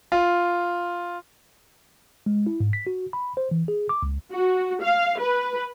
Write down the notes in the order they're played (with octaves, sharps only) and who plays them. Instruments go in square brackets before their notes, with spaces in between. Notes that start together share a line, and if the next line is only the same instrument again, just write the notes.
[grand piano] F4
[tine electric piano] G#3
E4
G#2
B6
F#4
B5
C5
E3
G#4
D6
C#2
[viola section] F#4
F5
B4